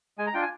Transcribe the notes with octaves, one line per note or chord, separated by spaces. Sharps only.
G#3 G#5
A#5
D4 F4 G5
G#5